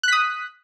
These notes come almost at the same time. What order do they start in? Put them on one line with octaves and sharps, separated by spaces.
F#6 B6 D#6